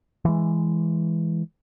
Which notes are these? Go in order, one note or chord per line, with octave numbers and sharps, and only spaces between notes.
E3 G#3